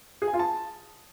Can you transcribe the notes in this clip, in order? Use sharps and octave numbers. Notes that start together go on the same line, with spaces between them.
G#4
G#5
F4
A5